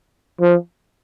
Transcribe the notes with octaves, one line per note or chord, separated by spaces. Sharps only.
F3